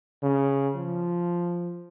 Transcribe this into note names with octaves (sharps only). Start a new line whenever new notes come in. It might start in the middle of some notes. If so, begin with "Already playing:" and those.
C#3
F3